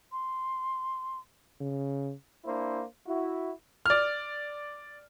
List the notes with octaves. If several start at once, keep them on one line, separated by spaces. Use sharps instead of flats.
C6
C#3
A#3 D4 E4 C5
E4 F#4
D5 F6